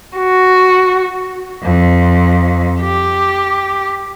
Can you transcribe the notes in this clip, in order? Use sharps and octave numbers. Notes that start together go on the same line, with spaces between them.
F#4
F2
G4